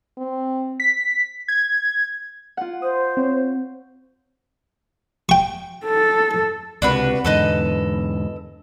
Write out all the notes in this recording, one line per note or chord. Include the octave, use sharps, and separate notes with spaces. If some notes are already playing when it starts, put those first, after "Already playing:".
C4
B6
G#6
F4 F#5
C5 D#6
C4 C#5
G5 C#6
A4
C#2 C3 D4 F#4 B4
E2 G#2 D3 A4 B4 D#5